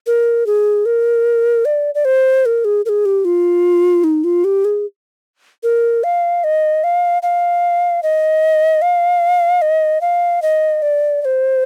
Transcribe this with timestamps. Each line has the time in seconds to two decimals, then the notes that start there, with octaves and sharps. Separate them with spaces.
0.07 A#4
0.47 G#4
0.86 A#4
1.65 D5
1.95 D5
2.05 C5
2.46 A#4
2.65 G#4
2.85 A#4
2.89 G#4
3.05 G4
3.25 F4
4.04 D#4
4.24 F4
4.44 G4
4.65 G#4
5.63 A#4
6.04 F5
6.44 D#5
6.84 F5
7.23 F5
8.03 D#5
8.82 F5
9.62 D#5
10.01 F5
10.42 D#5
10.82 D5
11.21 D5
11.25 C5